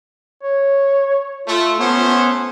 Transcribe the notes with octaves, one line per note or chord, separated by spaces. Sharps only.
C#5
A3 F4
A3 B3 C#4 C5